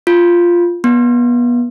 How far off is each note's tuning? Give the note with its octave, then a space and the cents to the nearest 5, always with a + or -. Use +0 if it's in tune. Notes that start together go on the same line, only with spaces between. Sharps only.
F4 -5
B3 -30